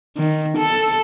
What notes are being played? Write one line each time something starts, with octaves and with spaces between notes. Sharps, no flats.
D#3
A4